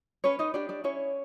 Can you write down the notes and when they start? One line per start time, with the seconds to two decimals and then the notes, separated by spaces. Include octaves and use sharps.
0.24 C#4 B4 C#5
0.39 D#4 D#5
0.54 D4 G4 D5
0.69 D4 D5
0.84 C#4 E4 C#5